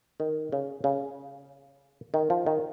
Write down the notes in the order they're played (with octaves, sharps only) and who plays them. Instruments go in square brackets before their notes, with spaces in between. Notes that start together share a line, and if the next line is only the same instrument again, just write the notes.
[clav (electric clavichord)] D#3
C#3
C#3
D#3
F3
D#3